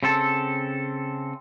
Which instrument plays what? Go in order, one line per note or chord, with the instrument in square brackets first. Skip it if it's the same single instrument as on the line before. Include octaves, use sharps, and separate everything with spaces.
[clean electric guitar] C#3 C4 A4